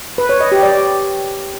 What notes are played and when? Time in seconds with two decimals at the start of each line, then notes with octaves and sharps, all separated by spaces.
0.18 B4
0.29 C#5
0.40 D#5
0.52 G4
0.63 D5